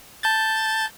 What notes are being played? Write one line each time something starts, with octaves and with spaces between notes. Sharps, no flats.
A5 G6 A6